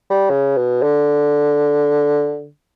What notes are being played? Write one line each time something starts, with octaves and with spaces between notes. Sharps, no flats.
G3
C#3
B2
D3